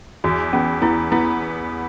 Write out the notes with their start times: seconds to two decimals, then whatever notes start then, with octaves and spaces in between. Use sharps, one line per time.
0.24 E2 F#4
0.53 B3 C#4
0.82 B3 E4
1.11 B3 E4